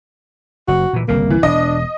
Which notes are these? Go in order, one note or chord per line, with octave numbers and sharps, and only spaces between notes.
F#1 F#4
A#2 E3
G1 C2 C#3 A#3
E3
E1 D4 D#5